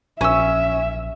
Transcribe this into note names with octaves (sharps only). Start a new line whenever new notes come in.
A#1 C#4 E5 E6